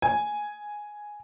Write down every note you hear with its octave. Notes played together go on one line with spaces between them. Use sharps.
G#5